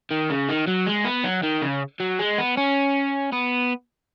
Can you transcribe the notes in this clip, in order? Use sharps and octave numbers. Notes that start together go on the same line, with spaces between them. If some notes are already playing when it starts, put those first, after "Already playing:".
D#3
C#3
D#3
F#3
G#3
B3
F#3
D#3
C#3
F#3
G#3
B3
C#4
B3